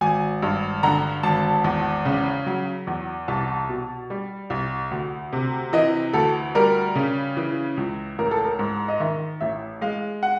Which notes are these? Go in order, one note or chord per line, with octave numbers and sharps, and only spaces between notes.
G#1 G#5
G2
D3 A#5
G#1 A5
E2
C#3
F#3
E2
C2 A5
B2
G3
C2
D2
C3
E3 D#5
D2 A4
G3 A#4
C#3
E3
C#2
A1 A#4
A4
A#4
G#2
D#5
D#3 E5
A1 E5
G#3 F5
F#5